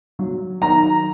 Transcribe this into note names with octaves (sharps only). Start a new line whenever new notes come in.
F#3
D#3 A#5